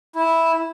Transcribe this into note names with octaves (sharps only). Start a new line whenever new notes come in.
E4